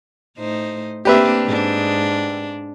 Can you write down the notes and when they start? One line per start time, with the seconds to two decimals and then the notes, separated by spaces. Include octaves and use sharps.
0.38 A2 D#4 C5
1.05 A#3 C4 D4 G4 B4 E5
1.46 G#2 D4